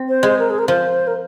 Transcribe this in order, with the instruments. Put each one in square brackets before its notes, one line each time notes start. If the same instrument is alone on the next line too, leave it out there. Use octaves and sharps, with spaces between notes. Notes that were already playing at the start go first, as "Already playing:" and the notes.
Already playing: [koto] C4
[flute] C5
[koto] G#3
[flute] A#4
G#4
A#4
[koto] F3 [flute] C5
[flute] A#4